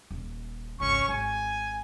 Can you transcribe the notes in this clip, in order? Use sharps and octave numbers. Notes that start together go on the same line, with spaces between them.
D#1
G#1 C#2 C#4 C#6
G#1 G#5